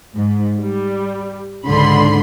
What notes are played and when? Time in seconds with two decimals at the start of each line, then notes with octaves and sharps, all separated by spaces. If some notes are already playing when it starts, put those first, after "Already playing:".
0.14 G#2
0.61 G3
1.65 C#2 G#2 D3 B5 C6